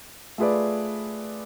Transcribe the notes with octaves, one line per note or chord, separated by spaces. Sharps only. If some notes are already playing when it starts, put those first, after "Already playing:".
A3 F4 G#4 B4 D5